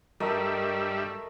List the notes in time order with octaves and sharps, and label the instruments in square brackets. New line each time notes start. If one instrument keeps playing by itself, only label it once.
[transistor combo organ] G2 G3 E5 [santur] A3 A#4 D#5